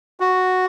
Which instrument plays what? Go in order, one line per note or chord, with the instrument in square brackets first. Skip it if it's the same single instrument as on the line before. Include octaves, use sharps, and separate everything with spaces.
[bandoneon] F#4